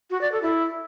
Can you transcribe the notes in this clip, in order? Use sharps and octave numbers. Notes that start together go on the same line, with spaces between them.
F#4
D5
A4
E4